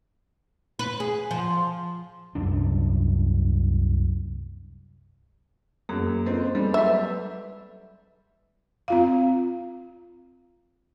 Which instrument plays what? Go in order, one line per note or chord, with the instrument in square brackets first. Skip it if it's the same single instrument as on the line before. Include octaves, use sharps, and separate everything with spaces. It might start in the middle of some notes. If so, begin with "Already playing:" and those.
[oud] B4
G#4
F3
[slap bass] C2 F#2 D4
[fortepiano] F#2 [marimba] A#3 G#4
[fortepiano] C4 F4 [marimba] A4 B4 D#5
[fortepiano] G3 G#3 [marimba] A4
[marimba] F#3 A4 B4 [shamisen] E5
[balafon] C4 F4 F5